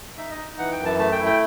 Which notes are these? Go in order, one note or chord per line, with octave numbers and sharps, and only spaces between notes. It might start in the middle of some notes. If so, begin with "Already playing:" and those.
D#4 E5
D#5
D#4
E3 F#5
G5
F#2
A5
A3 A5
G5
E4
G5